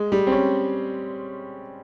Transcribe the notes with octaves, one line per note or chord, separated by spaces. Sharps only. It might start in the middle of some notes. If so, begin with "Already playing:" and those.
Already playing: G#3
G3
C4
C#4